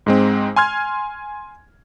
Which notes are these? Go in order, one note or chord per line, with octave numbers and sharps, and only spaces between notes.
G#2 G#3 C4
G#5 C6 F6 G#6